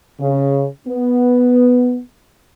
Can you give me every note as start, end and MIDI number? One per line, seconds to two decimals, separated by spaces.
0.20 0.65 49
0.87 1.99 59